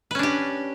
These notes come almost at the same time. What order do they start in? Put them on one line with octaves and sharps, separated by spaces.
B4 C#4 D4 G4